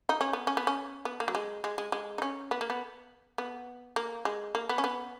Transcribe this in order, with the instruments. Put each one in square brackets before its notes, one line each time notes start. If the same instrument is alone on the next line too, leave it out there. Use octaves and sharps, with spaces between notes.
[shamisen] D#4
C#4
B3
C#4
B3
C#4
B3
A#3
F#3
G#3
G#3
G#3
G#3
D#4
C#4
B3
A#3
B3
B3
A#3
G#3
A#3
B3
C#4
B3